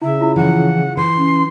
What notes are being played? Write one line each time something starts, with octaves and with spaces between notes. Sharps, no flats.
C#3 E4 E5
E4 F4
E3 F3 F#5
E3 C6
C#4